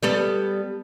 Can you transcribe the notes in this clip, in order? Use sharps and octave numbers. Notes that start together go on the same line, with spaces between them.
G3 B3 A4